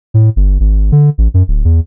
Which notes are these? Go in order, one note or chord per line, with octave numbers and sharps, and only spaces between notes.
A2
G1
G#1
D3
A1
F#2
D1
E2